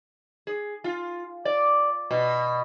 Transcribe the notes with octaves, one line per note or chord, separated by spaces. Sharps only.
G#4
F4
D5
B2